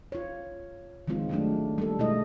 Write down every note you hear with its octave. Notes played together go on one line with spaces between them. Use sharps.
F4 C#5
D#3 F3 G#3 C4 F4
D#3 F#3 G#3 A3 D4
G3 A#3 A4
B2 G#3 A3 E4 D#5